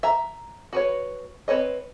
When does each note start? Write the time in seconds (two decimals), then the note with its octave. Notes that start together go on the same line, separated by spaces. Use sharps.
0.03 E5 A#5
0.73 F#4 B4 C#5
1.48 C4 B4 C#5 D#5